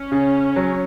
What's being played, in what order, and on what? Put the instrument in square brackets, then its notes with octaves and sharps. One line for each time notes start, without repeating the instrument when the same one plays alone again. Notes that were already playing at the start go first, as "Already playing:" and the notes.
Already playing: [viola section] C#4
[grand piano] C#3
F#3